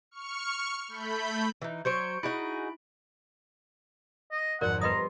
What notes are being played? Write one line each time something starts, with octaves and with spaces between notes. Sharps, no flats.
C#6 F6 C#7
A3 B5 G6
E3 D#4
F#3 C5 C#5 G6 C#7 D7
D#4 E4 F#4 G#4 B5 D7
D#5
G#1 F2 F#4 A#4 D5 F#5
G3 B3 B4 D#5 A#5 C6 D#6